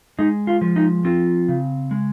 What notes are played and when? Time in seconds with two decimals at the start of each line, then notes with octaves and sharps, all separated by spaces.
0.19 G#3 D#4
0.47 F4
0.61 F3
0.76 D#4
1.05 C4 F4
1.48 C#3
1.91 G#3